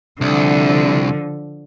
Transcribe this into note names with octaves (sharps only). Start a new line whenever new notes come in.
C2 D3 F3